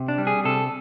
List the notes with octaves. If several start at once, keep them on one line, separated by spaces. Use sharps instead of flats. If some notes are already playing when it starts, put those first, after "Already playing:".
Already playing: C3
D4
G3
G#4
C3 A4